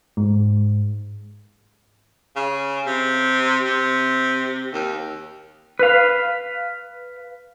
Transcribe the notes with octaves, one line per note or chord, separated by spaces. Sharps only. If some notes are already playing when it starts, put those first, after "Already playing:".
G#2
C#3
C3
C3
D#2
B4 F5